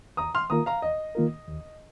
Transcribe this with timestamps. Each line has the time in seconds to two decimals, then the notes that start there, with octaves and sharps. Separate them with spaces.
0.17 D#2 A#5 D#6
0.35 C6 F6
0.50 D#3 A#3 F4 A#4 A#5 D#6
0.66 F5 A#5
0.82 D#2 D#5
1.15 D#3 A#3 F4 A#4
1.48 D#2